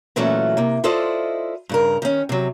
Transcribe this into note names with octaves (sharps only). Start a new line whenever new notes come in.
A#2 E3 F#3 A3 C#4 F#4
C3 A#3
E4 F4 A4 C5 D5 D#5
G2 C#3 A#4
D#3 C#4
C3 F#3